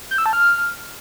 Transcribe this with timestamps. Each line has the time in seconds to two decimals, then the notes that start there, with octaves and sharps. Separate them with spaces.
0.11 G6
0.18 E6
0.26 A5
0.33 F6